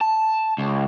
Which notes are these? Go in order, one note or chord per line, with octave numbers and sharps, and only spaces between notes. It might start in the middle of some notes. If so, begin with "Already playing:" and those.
A5
C#2